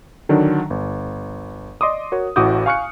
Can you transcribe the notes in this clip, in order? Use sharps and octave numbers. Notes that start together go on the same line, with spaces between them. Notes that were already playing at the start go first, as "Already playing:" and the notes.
D3 D#3 F#3 D4
G1
D5 D#5 C6 D6 D#6
F#4 A#4 C#5
A1 A2 F#4 D6 D#6 G6
F5 G#5 C#6 F6 F#6 C#7